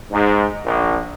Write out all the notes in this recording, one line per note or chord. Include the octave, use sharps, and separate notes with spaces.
G#2
A#1